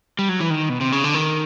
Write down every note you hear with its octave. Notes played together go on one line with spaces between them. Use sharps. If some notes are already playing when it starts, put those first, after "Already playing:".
G3
F#3
E3
D#3
B2
C3
C#3
D3
D#3